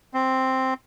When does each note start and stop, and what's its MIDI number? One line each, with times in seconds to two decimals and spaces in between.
0.14 0.74 60